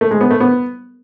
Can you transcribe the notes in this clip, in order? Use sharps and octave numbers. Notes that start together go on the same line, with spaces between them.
A3
G#3
B3
A3
B3